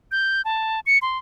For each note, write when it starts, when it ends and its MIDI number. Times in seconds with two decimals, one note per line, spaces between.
0.12 0.42 91
0.45 0.80 81
0.86 0.98 97
1.02 1.18 84